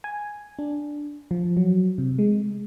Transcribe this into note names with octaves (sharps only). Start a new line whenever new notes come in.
G#5
D4
F3
F#3
C3
G#3